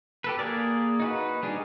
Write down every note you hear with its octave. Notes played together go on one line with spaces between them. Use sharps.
G4 A4 B4
A#3 G#4 A#4 D5
D#4 F#4 B4
G3 D4 G#4